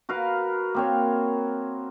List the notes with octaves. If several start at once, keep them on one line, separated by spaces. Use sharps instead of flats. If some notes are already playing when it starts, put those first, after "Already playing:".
F#4 A#4 B4 F5
A#3 C4 C#5